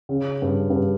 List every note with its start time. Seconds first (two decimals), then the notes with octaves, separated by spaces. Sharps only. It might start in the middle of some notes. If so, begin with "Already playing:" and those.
0.09 C#3
0.42 G2
0.70 G2